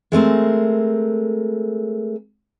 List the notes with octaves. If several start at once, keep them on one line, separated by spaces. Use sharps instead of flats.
G#3 A3 C4 A#4